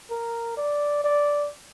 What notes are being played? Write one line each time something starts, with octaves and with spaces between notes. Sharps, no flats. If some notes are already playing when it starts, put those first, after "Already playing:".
A#4
D5
D5